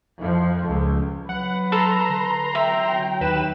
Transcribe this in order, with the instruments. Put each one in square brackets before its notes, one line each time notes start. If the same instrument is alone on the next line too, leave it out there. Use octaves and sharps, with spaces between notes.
[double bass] F2 F3
C#2
[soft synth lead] F#3 [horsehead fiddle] B4 [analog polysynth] F#5
[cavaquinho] A4 [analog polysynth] A#5 C6
[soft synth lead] D3
[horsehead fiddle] F#3 G5 [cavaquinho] E5
[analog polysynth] D#2 B4 E7